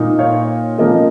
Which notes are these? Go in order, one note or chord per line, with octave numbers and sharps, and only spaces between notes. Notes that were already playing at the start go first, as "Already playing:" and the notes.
Already playing: A#2 A#3 D#4
C#5 F5
F3 A#3 C#4 F4 A#4 D#5